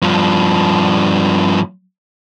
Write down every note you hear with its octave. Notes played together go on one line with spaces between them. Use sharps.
G2 F3